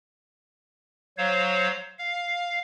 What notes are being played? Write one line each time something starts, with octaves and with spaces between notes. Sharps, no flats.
F#3 C5 C#5 F5
F5